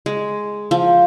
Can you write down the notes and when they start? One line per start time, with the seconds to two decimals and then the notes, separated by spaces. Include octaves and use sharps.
0.06 G#3
0.71 F3